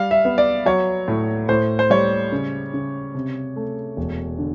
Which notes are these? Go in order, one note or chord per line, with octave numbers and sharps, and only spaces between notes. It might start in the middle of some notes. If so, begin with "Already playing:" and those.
Already playing: G3 F5
E5
B3
D5
F#3 C#5
A2
A2 C5
C5
G3 C#5
C#3
C#3
C3
A3
E1
D3